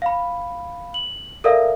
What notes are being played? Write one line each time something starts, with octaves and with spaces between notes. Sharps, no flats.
F5 B5
F#7
A4 A#4 D5 E5 F5